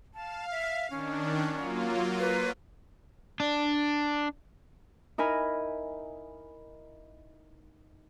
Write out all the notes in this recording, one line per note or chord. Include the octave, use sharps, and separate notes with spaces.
F5 A5
E5
D#3 C#4 D4
F#3 A#3 F4
B4
D4
D#4 E4 A#4 G#5 B5